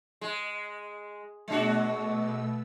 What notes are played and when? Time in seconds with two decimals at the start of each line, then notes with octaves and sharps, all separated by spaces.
0.21 G#3
1.48 B2 G#3 A3 D4 F#4 E6